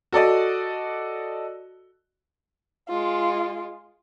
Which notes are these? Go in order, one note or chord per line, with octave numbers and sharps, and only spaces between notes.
F#4 A4 D5 D#5
G#3 F4